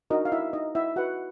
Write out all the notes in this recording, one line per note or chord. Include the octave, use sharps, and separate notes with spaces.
D4 D#4 F#4 A#4 D#5
F5
E4 E5
D#4 D#5
E4 E5
F#4 B4 F#5